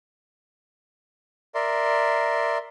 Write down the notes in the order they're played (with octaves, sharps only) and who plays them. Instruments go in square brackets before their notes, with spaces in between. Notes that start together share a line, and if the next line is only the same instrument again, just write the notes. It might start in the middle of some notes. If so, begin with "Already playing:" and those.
[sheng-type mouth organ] A#4 D5 E5 C6